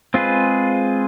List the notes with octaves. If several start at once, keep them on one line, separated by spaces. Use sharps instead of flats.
G#3 C4 F4 G#4 B4